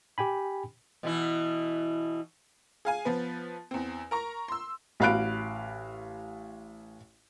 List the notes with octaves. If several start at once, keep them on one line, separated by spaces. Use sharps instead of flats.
G4 G5 G#5 B5
B2 E3 E4
G#4 F5 G#5
F3 B3 B4
E2 C4
A#4 A#5 C#6
C6 E6
A1 F#4 F5 B5 F#6 D7